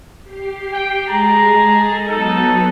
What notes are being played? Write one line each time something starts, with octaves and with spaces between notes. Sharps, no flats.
G4 C7
G5
G#3 G#4 A5 A#5
A4 D#5
F#3 B3 D#4 A4 F#6